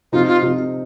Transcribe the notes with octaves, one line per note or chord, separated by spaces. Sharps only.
C3 F3 C4 D#4 F4
F4
C3 F3 C4 D#4